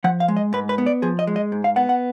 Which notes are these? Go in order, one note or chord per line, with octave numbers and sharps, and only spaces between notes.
F3 F#5
F5
G#3
D#5
G#2 B4
B4
B3
D5
F3 G#4
D#5
G#3
D#5
G#2
F5
B3 F#5
F#5